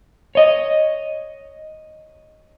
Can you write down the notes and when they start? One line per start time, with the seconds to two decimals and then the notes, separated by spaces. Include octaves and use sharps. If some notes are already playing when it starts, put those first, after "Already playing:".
0.35 C#5 D#5